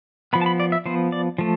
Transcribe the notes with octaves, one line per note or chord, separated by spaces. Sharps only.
F3 B3 B5
A5
B5
D5
E5
F3 B3 C5
D5
F3 A3